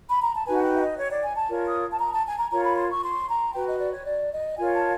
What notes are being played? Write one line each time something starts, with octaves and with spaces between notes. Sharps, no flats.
B5
A#5
A5
D#4 F#4 B4 G#5
F#5
G5
E5
D#5
C#5
D5
G#5
A5
F4 A#4 C#5
D#6
A5
A#5
A5
G#5
A#5
F4 A#4 C#5 A#5
B5
C6
C#6
C6
A#5
F#4 B4 G5
D#5
D5
C#5
D5
D#5
F4 A#4 C#5 G#5
A5